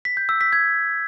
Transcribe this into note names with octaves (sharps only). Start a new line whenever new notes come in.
B6
G6
E6
B6
G#6